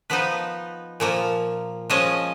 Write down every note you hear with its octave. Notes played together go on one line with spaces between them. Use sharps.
F3 B3 D#4 B4
A#2 F3 A#3
F3 G#3 C#4 D#5